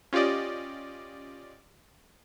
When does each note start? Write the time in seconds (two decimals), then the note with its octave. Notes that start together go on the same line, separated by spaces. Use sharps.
0.13 C#4 F4 G4 D5 D#5